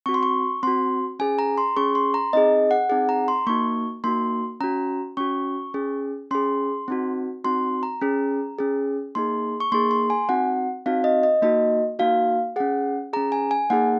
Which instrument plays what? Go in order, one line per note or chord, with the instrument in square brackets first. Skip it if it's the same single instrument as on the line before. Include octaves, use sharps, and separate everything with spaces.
[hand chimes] C4 F#4 C#6
C6
C#6
C4 F#4 C6
C#4 G#4 G#5
A#5
C6
C#4 G#4 C#6
C6
A#5
C4 D#4 G#4 D#5
F#5
C4 D#4 G#4 F#5
A#5
C6
A#3 D#4 F#4 C#6
A#3 D#4 F#4 C6
C#4 F#4 A#5
C#4 F#4 C#6
C#4 G#4
C#4 G#4 C6
C4 D#4 F#4
C4 D#4 F#4 C6
A#5
C#4 G#4
C#4 G#4
A#3 D#4 G#4 C6
C#6
A#3 D#4 G#4 C6
C6
G#5
C4 D#4 F#4 F#5
C4 D#4 F#4 F5
D#5
D#5
A#3 D#4 F#4 D#5
A#3 D#4 F#4 F5
C#4 G#4 F#5
C#4 G#4 A#5
G#5
G#5
A#3 D#4 G#4 F#5